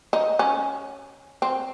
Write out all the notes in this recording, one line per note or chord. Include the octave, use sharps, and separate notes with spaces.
D#4
C#4
C4